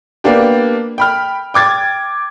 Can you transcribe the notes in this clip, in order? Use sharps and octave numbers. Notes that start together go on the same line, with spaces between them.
A#3 B3 D4 G4
G5 B5 F6
G5 D6 G#6 A6